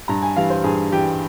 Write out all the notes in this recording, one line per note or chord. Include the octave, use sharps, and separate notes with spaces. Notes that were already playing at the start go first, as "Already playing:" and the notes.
G2 A#5
G#5
E3 G3 F5
C5
G2 G#4
E3 G3 G4